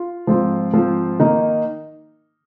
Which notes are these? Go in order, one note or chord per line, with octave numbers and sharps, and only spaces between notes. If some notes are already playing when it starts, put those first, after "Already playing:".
Already playing: F4
G#2 F3 C4 F4
G#2 F3 C4 F4
D#3 A#3 D#4